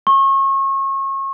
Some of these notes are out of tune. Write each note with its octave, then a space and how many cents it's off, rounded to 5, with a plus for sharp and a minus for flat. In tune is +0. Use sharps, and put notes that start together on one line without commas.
C#6 -35